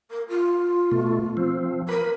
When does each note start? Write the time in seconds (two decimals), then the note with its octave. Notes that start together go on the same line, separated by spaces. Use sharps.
0.10 A#4
0.29 F4
0.92 B2 A3
1.37 F3 C4
1.89 A#4 B4 B5